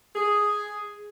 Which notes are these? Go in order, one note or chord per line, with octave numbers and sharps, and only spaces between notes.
G#4